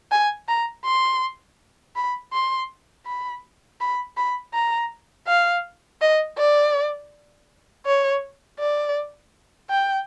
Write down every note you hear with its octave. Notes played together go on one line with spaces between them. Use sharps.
G#5
A#5
C6
B5
C6
B5
B5
B5
A#5
F5
D#5
D5
C#5
D5
G5